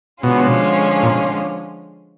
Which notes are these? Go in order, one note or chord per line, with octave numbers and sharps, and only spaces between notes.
B2 D3 F3 G#3 C#4 F4
A#2